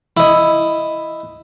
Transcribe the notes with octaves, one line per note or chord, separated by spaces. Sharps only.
E4 D#5